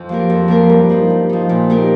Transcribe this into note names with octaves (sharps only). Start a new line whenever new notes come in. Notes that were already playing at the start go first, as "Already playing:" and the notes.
Already playing: F2
F3 A#3 G4 A#4
F2
F3 A#3 G4 A#4
G2
F3 D#4
G2
F3 D#4
A#2
A#3 D#4 G4 A#4